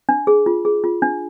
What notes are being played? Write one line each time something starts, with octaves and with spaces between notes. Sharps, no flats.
D4
G#4
F4
G#4
F4
D4